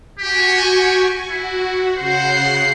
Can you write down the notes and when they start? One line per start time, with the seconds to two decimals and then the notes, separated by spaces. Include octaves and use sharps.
0.19 F#4 G4 G#5 C#6
1.30 E4 F#4
1.97 C#3 C5 F#5 C7